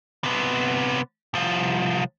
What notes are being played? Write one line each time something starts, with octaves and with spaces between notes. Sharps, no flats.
C3 B3
C2 F3